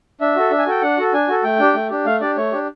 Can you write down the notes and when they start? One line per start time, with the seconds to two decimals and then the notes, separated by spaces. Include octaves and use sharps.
0.21 D4 E5
0.36 F#4 A4
0.51 D4
0.59 G#5
0.66 F#4 A4 G5
0.82 D4 F#5
0.98 F#4 A4
1.13 D4 G#5
1.28 F#4 A4
1.44 A3 G5
1.59 D4 G4
1.74 A3
1.90 D4 G4
2.05 A3 F5
2.21 D4 G4 D5
2.37 A3 C#5
2.52 D4 G4